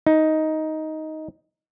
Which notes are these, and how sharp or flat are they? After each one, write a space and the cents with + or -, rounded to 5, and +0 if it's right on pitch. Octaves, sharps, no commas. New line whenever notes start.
D#4 +10